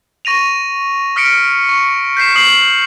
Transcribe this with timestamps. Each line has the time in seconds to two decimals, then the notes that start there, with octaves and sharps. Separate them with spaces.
0.25 C#6 A#6 D#7 F7
1.16 D#6 F6 B6 C#7 D7
1.69 C#6
2.17 G6 B6 C7 E7
2.35 D#6 C7 F#7